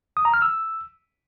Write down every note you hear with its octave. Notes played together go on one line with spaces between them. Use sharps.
D#6
A#5
F6
E6